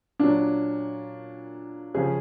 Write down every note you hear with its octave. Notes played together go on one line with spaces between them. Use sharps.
A#2 F#3 D4
C#3 F3 G#4